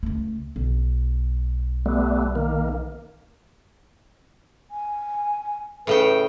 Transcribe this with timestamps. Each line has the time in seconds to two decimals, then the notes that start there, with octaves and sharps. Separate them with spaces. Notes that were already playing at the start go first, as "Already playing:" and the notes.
0.03 C#2 A3
0.56 B1
1.86 G3 A3 B3
2.35 D#3 A#3
4.71 G#5
5.87 A2 C#3 B4 G5